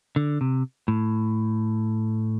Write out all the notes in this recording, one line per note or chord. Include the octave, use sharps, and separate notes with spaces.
D3
C3
A2